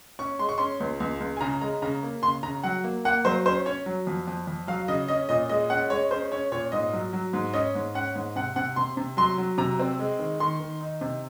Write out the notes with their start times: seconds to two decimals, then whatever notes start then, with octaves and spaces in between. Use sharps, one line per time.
0.19 C#4 C#6
0.39 G#3 C6
0.49 C#6
0.58 C#4 C6
0.80 C#2
1.00 C#2
1.20 C#2
1.37 G#5
1.41 C#3 A#5
1.61 G#3 A#5
1.82 C#3 A#5
2.03 A#3
2.23 C#3 C6
2.43 C#3 A#5
2.63 F#3 F#5
2.84 A#3
3.05 A#3 F#5
3.25 F#3 C5
3.46 C#4 C5
3.66 C#4 C#5
3.86 F#3
4.07 F2
4.27 F2
4.47 F2
4.67 F#3 F5
4.88 C#3 D#5
5.08 C#4 D#5
5.29 A#2 D#5
5.49 G#3 D#5
5.70 C#4 F#5
5.90 G#3 C#5
6.11 C#4 C5
6.32 C#4 C#5
6.52 A#2 C#5
6.72 G#2 D#5
6.93 F#3
7.13 F#3
7.33 G#2
7.54 C#4 D#5
7.75 G#2
7.95 C#4 F#5
8.15 G#2
8.36 C3 F#5
8.56 C3 F#5
8.76 C3 C6
8.97 C3
9.17 F#3 C6
9.38 F#3
9.58 C3 A#5
9.79 C4
9.99 G#3
10.19 D#3
10.40 D#3 C6
10.60 D#3
10.81 D#4
11.01 C3